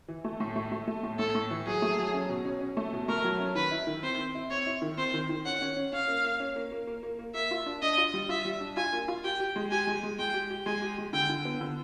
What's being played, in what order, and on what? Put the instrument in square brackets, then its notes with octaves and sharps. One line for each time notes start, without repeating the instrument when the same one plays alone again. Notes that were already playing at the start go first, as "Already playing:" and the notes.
[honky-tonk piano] E3
A3
A2
A3
A3
A3
A2
[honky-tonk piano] A2 [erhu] A4
[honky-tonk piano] A2
E3
[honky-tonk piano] F#3 [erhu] G#4
[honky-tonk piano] A3
F#3
C#4
B2
C#4
C#4
A3
B2
[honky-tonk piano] A3 [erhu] A#4
[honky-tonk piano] F#3
C#4
[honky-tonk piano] D#3 [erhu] B4
[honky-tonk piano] E4
D#3
[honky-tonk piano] C4 [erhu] C5
[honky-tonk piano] C4
E4
[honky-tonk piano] C4 [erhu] C#5
[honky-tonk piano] E4
D#3
[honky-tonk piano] C4 [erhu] C5
[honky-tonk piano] D#3
D#3
[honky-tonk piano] C#4 [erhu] F#5
[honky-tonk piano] C#4
C#4
[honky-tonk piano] C#4 [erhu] F5
[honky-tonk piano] A#3
A#3
C#4
A#3
A#3
A#3
A#3
A#3
[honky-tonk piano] A#3 [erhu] E5
[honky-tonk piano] F4
D4
[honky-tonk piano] D4 [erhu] D#5
[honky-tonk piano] F4
G3
[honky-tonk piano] F4 [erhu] E5
[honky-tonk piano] G3
D4
[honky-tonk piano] F4 [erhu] G#5
[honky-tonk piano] A#3
F4
[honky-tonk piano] G4 [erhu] G5
[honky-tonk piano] G4
G#3
[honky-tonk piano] G4 [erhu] G#5
[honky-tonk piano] G#3
G#3
[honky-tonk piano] G#3 [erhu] G5
[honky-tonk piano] G4
G4
[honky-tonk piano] G#3 [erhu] G#5
[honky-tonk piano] G4
G#3
[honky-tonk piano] D3 [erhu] G5
[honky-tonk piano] D3
B3
D3